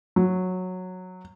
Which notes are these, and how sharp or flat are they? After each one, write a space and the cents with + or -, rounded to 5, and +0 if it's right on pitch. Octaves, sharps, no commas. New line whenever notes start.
F#3 -10